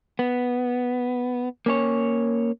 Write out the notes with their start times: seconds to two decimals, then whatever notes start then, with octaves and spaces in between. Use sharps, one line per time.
0.19 B3
1.66 A#3 C#4 C#5